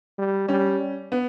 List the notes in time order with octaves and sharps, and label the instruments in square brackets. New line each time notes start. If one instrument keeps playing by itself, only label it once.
[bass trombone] G3
[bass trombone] G3 [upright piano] C#4
[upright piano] B3